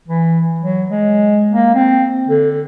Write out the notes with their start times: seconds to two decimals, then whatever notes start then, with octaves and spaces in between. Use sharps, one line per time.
0.08 E3
0.60 F#3
0.89 G#3
1.51 A#3
1.75 C4
2.28 D3